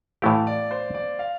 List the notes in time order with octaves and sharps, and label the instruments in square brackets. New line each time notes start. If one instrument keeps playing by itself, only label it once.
[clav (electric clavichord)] A2 E3 A3 E4 G4 [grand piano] F5
[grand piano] D5
C5
D5
F5